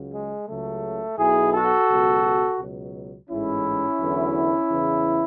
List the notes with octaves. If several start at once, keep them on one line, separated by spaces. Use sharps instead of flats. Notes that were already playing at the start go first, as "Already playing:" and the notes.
Already playing: C#2 C#3 F#3
G#3
C#2 C#3 F#3 A3
B1 B2 F#3 E4 G#4
F#4 A4
C#2 B2 F#3
C#2 B2 F#3
A1 G#2 E3 C#4 E4
E2 D3 F#3
E2 C#3 E3